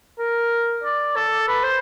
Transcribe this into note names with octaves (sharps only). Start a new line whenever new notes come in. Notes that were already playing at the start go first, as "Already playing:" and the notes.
A#4
D5
A4
B4
C5